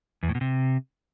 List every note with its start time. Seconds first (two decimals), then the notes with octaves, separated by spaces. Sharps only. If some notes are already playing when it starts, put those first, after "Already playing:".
0.23 E2
0.29 A2
0.35 B2
0.41 C3